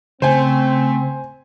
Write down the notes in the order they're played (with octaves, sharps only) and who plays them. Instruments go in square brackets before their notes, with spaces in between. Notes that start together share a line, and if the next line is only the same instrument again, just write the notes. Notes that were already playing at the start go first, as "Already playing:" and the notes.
[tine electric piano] C#3 [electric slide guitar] A3 [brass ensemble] C4 [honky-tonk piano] C5 G#5